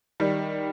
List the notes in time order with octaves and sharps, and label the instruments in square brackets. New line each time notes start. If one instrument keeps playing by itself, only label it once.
[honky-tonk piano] D#3 G3